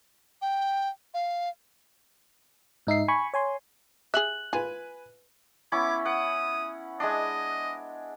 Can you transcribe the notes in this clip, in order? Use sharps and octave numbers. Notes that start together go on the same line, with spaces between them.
G5
F5
G#2 D#4 E5 C7
G#5 B5 C#6
C#5 G#5 C6
G#4 E5 F#6 F#7
F4 B4 G#5
B3 C#4 E4 D6
F#5 D#6
G#3 D4 D#5